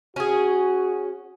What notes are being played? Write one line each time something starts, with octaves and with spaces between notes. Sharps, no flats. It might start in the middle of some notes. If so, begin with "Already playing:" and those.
C#4 F#4 G#4